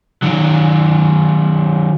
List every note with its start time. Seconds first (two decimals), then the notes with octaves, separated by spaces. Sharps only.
0.22 D#3 F#3